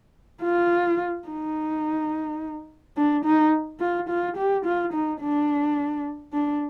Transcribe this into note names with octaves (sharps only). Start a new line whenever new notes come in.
F4
D#4
D4
D#4
F4
F4
G4
F4
D#4
D4
D4